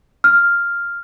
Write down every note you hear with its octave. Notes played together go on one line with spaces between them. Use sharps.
F6